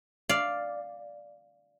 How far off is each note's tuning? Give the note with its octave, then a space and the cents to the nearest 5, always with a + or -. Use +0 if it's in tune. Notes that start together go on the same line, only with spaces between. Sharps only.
D5 +0 F5 +0